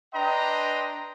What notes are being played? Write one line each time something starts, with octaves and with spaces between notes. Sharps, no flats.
D4 B4 D#5 G5 A#5 C6